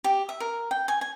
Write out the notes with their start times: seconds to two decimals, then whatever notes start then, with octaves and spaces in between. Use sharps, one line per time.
0.04 G4
0.29 E5
0.40 A#4
0.71 G5
0.88 G#5
1.01 G#5